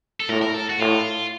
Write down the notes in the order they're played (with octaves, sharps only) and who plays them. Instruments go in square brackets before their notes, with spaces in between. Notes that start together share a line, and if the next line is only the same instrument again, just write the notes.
[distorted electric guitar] A4
[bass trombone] A2 [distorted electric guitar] A#4
[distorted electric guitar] A#4
A4
F#4
[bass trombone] A2 [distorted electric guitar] F4